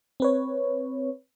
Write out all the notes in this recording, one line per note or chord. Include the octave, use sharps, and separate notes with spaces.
C4 B4 C#5